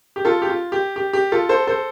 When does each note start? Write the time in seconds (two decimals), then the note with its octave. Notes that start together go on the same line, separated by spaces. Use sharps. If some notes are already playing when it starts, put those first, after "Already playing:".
0.16 G4
0.25 F4 A4
0.42 G4
0.49 F4
0.72 G4
0.96 G4
1.13 G4
1.32 F4 A4
1.49 A4 C5
1.67 A4 C5